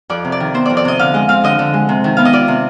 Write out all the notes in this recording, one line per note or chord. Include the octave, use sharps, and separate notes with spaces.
F2 D5
C3
D5
D#3
B3 C5
F2 D5
D5
C3 D#5
D3 F5
G#3 D#5
C4 F5
D3 D#5
D3
G#3
C3
D#3
B3 F5
D#5
F4 D5
C3